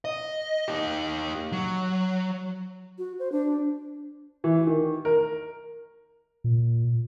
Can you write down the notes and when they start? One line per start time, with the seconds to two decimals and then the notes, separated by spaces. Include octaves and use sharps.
0.05 D#5
0.68 D#4 G4
1.52 F#3
2.98 F#4
3.19 C5
3.32 D4
4.44 E3
4.67 D#3
5.05 A#4
6.44 A#2